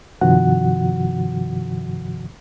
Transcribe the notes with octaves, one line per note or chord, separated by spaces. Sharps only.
G2 C3 D#3 F3 F#4 F#5